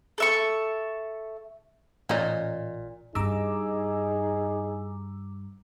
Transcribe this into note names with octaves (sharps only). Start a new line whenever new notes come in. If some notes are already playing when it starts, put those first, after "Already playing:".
A4 E5 C#6
A1 A#2 C#4 D#4
G2 D#4 G#4 A#5 D6 E6